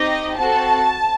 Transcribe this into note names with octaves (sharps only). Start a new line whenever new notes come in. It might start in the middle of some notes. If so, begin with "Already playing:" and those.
Already playing: C4 D#4 G4 D#5
C4 F#4 A4 A5